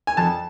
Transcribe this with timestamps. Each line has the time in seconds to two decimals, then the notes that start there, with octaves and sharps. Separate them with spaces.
0.07 G#5
0.17 F2 A5